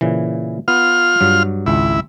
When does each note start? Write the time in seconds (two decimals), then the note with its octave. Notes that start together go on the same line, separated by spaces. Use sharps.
0.01 A#2 C#3 E3
0.68 B3 F4 F6
1.21 G2 F#3
1.66 G#1 C#2 E4